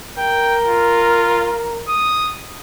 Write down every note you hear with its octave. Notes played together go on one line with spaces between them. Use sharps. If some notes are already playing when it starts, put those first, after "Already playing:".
A#4 G5
F4
D#6